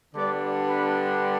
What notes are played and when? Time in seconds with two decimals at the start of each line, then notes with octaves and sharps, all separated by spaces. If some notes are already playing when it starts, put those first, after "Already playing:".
0.15 D3 G3 B3 D4 D5
0.67 B4